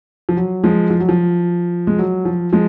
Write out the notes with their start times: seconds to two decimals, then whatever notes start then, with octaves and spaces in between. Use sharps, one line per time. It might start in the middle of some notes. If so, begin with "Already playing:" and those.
0.29 F3
0.37 F#3
0.64 F3 G#3
0.90 F3
1.00 F#3
1.09 F3
1.87 G#3
1.99 F#3
2.25 F3
2.53 F3 G#3